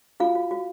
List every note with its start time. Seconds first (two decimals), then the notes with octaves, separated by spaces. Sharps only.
0.20 F4 F#4 F5
0.35 F#4
0.51 F#4